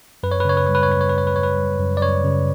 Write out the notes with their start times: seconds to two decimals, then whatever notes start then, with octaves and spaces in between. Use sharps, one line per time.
0.23 F#2 B4
0.32 C#5
0.40 B4
0.45 C#3 C#5
0.57 B4
0.66 G3 C#5
0.75 B4
0.83 C#5
0.90 F#2 B4
1.01 C#5
1.09 F#2 B4
1.18 C#5
1.27 B4
1.35 C#3 C#5
1.43 B4
1.57 G3
1.79 F#2
1.97 D5
2.02 F#2 C#5
2.24 C#3